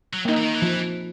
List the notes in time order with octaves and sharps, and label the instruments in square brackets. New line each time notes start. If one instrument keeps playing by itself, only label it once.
[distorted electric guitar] F#3
[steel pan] A#3 D#4
[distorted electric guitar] E3
D#3
E3
[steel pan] F3